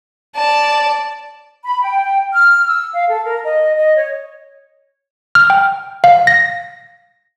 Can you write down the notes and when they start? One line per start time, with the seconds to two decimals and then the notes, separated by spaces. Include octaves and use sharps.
0.36 D5 A5
1.64 B5
1.83 G5
2.33 F6
2.66 E6
2.94 F5
3.10 A4
3.25 A#4
3.44 D#5
3.77 D#5
3.97 C#5
5.35 F6
5.50 G5
6.04 F5
6.27 A#6